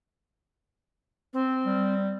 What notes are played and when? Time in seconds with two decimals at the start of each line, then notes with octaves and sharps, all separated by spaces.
1.33 C4
1.65 G3